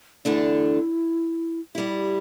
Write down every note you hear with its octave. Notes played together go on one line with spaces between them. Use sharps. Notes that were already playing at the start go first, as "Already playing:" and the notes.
E2 D3 A3 D4 E4
A2 G3 E4 G4